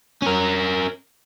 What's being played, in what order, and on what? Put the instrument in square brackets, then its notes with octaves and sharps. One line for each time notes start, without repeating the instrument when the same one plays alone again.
[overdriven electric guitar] C#4 A#4